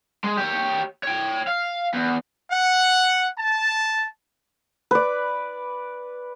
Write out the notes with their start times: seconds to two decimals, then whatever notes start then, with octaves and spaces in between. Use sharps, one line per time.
0.24 G#3
0.38 G4 C#5
1.03 C#5 G5
1.48 F5
1.94 E2
2.51 F#5
3.38 A5
4.91 B4 D5